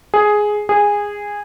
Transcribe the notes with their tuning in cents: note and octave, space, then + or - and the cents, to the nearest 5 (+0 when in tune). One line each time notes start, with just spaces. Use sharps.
G#4 +5
G#4 -15